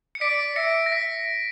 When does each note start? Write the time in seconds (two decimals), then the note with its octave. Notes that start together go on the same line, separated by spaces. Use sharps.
0.15 C#7
0.21 D5 B6 D7
0.56 E5 A#6 C#7
0.86 A#6
0.92 E5 B6